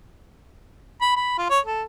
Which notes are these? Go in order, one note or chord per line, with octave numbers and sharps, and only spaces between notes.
B5
B5
F4
C#5
A4